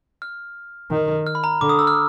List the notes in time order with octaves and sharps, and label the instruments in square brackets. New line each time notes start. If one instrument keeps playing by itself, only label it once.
[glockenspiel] F6
[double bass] D#3
[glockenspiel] F6
B5
A#5
[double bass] D3 [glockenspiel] D6
[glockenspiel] D#6
E6
F6